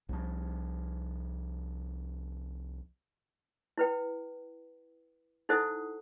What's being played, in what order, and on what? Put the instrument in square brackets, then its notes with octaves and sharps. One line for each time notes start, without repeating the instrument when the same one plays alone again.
[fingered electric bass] C2 F3
[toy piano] E4 B4 G5
D#4 E4 A4 C5 F#5 D#6